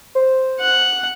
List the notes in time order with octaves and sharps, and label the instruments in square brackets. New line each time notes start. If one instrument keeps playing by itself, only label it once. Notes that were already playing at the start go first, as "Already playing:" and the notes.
[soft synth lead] C5
[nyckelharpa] F#5